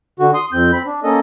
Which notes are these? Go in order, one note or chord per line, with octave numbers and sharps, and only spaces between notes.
D3 F#4
C6 D#6
F2 C4 G6
C4 B5
D4
A#3 C#4 A4 D#5